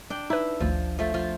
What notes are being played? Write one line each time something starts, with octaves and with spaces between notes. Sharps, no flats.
D4 G5
D#4 E4 B4
G#1 D2 F3
F3 A3
F3 F4